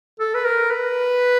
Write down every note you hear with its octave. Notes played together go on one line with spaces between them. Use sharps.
A4
B4
A#4
B4